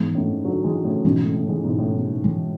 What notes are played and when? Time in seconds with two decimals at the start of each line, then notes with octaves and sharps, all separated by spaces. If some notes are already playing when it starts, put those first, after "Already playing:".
Already playing: G#2 E3 G#3 B3
0.14 F#2 A2
0.44 D3 F#3
0.64 E3 G#3
0.84 A2 C#3
1.04 G#2 B2 E3 G#3 C#4
1.19 A2 C#3
1.34 A2 C#3
1.49 E3 G#3
1.64 G#2 B2
1.79 A2 C#3
1.94 G#2 B2
2.09 G#2
2.24 A2 E3 G#3